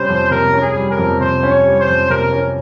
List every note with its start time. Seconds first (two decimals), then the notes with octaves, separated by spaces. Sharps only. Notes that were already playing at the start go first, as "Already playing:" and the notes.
Already playing: C3 G3 C#4 C5
0.09 F2
0.31 C3 A#4
0.54 C#4
0.61 G#4
0.76 G3
0.91 A#4
0.98 F2
1.20 C3 C5
1.43 C#4
1.50 C#5
1.65 G3
1.80 C5
1.88 F2
2.10 C3 A#4
2.33 C#4